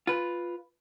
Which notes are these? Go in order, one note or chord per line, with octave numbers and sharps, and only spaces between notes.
F4 B4